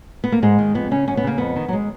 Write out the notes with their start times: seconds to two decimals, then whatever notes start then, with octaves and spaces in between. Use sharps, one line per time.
0.24 B3
0.32 A#3
0.42 G#2 G#3
0.59 D#3
0.75 F2 B3
0.91 C#3 C#4
1.08 F#2 C#4
1.17 B3
1.24 C#3 A#3
1.38 F2 B3
1.56 D#3
1.68 F#3
1.73 G#3